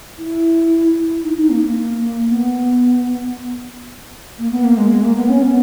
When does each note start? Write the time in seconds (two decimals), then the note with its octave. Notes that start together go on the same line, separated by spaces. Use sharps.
0.18 E4
1.23 D#4
1.36 D#4
1.49 A#3
1.62 A#3
2.28 B3
4.38 A#3
4.51 B3
4.64 A#3
4.77 G#3
4.90 G#3
5.03 A#3
5.16 B3
5.28 C#4
5.42 B3